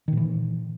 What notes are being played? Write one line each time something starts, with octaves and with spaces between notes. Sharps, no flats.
A#2 D#3 E3